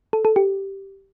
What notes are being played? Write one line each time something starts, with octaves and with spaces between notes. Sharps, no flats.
A4
A4
G4